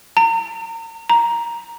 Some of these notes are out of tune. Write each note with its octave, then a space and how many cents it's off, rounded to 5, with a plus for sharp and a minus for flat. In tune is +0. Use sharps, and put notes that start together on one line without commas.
A#5 -40
A#5 +5